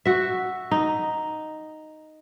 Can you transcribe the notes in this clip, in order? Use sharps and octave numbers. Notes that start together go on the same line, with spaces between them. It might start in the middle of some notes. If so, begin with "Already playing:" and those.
F#4 E5
D#4